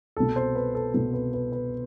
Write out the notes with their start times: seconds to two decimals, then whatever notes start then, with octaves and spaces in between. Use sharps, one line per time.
0.17 C2 B2 A4
0.36 C5
0.56 B4
0.75 A4
0.94 C2 B2 A4
1.14 B4
1.34 B4
1.52 B4